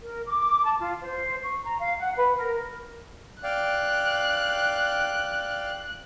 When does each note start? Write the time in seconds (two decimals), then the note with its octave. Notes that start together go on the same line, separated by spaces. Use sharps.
0.02 A#4
0.26 D6
0.65 A5
0.79 F4
1.02 C5
1.43 C#6
1.65 A#5
1.79 F5
1.99 F#5
2.17 B4
2.36 A#4
3.43 D5 F5 G5 F#6